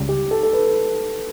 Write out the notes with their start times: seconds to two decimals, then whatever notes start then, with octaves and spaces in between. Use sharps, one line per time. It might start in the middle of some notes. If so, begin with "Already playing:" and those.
Already playing: C#2 C#3 G3
0.09 G4
0.31 A4
0.43 A4
0.53 B4